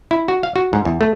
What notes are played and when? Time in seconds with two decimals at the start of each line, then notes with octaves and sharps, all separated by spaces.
0.11 E4
0.28 F#4
0.43 F5
0.56 F#4
0.73 G#2
0.85 E2
1.01 A3